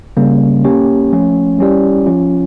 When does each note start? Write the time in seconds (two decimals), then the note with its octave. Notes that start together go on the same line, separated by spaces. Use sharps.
0.17 C#3 G3 A#3 C#4
0.65 A#3 C#4 G4 C#5
1.13 F3 A3 C#4
1.59 G3 C#4 E4 G4 D5
2.06 F3 C#4 F4